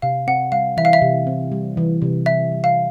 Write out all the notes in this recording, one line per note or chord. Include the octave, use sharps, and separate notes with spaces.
C3 F5
C4 F#5
G3 F5
E3 E5
F5
E5
C3
C4
G3
E3
C3
C4 E5
G3
F5